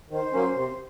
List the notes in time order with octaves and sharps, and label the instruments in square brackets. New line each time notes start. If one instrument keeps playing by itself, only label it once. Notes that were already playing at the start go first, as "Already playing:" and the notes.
[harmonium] D#3 [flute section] C5
[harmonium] F#3 A#3 C#4
C3